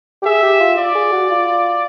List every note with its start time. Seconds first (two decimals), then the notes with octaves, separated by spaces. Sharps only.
0.22 G4
0.26 G#4 E5
0.43 G4
0.60 F4
0.78 F4 D5
0.95 G#4
1.12 F#4
1.31 F4